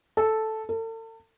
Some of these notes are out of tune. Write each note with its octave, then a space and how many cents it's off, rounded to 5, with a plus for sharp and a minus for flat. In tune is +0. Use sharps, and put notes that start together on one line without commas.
A4 -5
A4 +40